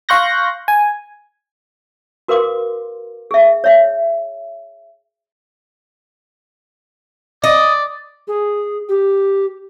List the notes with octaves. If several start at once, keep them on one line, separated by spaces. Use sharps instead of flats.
F5 C6 C#6 F#6 G6 A#6
G#5
F#4 A#4 B4 F5 C6 D6
G#4 E5
C#5 E5
D5 D#5
G#4
G4